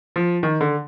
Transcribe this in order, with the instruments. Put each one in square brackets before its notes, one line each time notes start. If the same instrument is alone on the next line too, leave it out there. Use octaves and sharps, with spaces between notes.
[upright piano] F3
D#3
D3